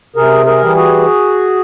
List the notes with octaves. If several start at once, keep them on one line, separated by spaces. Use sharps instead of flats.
C3 G#4 A#4
G#4 A#4
E3 G3
F#4 G#4